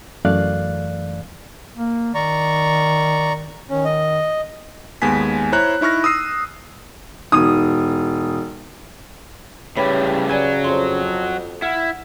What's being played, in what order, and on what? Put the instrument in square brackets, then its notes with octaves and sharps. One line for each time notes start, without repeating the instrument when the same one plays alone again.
[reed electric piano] F#2 E3 A3 D5 F5 F#6
[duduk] A#3
[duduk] D#3 [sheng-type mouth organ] D5 A#5 C#6
[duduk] D#3 [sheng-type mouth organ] C#4
[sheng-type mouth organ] D#5
[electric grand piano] D#2 G#3 B3 G#5 B6
E4 C5 C#5 A#5 F#6
D#4 E4 C#6 F6 A#6
D#6 E6 C7 D#7
[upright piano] E1 D#6 [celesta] D#4
[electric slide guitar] A2 G3 [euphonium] C#3 [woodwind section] G4 B4 [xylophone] C#5 B5 B6
[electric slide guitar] F#3 [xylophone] D5 G#5 G#6
[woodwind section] F2 [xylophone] C5 C6
[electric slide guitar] E4 [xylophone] F#5 F6